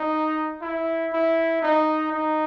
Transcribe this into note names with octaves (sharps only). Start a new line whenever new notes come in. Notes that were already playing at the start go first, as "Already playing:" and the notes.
Already playing: D#4
E4
E4
D#4
D#4